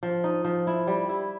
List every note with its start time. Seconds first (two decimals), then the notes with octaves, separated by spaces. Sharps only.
0.03 F3
0.24 D#4
0.45 F3
0.67 E4
0.87 G3
1.09 E4